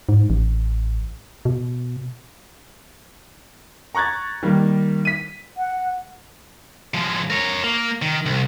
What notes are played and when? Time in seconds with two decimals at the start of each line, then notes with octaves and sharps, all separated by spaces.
0.09 G#2
0.30 A1
1.45 B2
3.95 A#5 C#6 F#6 G#6 A6
4.43 D#3 G3 A#3
5.05 B6 D#7
5.57 F#5
6.94 F3 G#3
7.30 A#4 C#5
7.64 A#3
8.02 D#3
8.26 C2